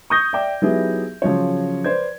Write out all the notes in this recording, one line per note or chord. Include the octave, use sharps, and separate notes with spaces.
C#6 D#6 G6 A#6
D5 E5 G5 D6
F#3 B3 D#4 E4 G4 G#4
C#3 F3 F#3 F4 C#5
B4 C5 D5 G#6